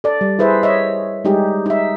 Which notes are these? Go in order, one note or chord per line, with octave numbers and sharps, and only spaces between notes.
A4 D5
G3
E4 G#4 B4 C5 E5
C#5 D#5 E5
G3 G#3 D#4 G4 G#4
D#4 E5